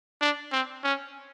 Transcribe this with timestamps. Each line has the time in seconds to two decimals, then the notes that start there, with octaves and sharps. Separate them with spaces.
0.21 D4
0.52 C4
0.84 C#4